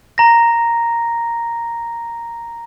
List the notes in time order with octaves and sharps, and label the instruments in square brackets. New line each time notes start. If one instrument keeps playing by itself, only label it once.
[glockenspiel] A#5 A#6